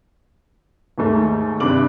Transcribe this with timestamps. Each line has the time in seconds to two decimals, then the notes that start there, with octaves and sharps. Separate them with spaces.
0.98 D#2 G#2 A3
1.60 G2 C3 D6 F#7